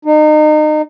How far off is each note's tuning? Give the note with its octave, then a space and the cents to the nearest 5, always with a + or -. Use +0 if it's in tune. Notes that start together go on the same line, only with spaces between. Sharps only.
D#4 -30